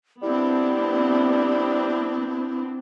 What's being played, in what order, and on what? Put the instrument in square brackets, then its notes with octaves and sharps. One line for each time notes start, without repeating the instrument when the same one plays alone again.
[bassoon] G3 [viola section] B3 C4 D4 [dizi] E4